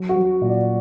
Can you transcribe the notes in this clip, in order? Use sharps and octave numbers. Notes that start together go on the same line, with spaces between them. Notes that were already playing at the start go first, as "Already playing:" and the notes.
Already playing: F#3
F#4
F#3
A#2
D5